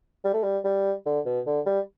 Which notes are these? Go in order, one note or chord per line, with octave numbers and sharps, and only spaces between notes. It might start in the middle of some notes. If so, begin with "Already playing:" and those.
G3
A3
G3
G3
D3
B2
D3
G3